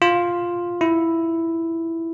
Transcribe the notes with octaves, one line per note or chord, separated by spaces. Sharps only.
F4
E4